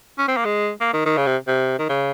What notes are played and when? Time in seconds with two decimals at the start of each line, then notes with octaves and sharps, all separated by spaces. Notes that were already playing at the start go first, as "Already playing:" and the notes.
0.18 C#4
0.28 C4
0.37 A#3
0.45 G#3
0.81 A#3
0.93 D#3
1.06 D#3
1.18 C#3
1.27 C3
1.48 C3
1.79 D#3
1.89 C#3